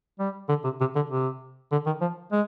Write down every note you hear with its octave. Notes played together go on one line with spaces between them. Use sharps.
G3
D3
C3
C3
D3
C3
D3
D#3
F3
G#3